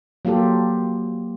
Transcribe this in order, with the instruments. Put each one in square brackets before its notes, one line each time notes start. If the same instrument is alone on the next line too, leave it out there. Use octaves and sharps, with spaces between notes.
[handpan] F#3 A#3 F4 G4 A4